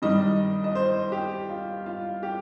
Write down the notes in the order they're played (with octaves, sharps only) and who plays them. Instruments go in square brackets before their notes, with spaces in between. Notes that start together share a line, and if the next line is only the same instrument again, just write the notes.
[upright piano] G2 D#3 G3 D#5
D#5
C5
G4
F4
F4
G4